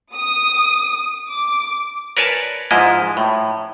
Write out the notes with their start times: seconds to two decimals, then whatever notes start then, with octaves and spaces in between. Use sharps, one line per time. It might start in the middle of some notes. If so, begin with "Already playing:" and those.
0.15 D#6
1.30 D6
2.17 A#4 B4 C#5 D5 G#5 A5
2.71 G#2 F3 G#3 E4 D#5
3.17 A2